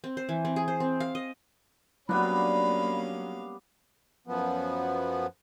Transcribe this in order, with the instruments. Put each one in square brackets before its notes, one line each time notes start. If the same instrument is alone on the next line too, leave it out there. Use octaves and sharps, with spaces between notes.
[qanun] C4
C5
E3
C4
G#4
C5
C4
F5
D#5
[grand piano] F#3 [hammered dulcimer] G3 B3 D4 [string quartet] A#3 C#4 F5 [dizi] B5
[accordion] F#2 F3 B3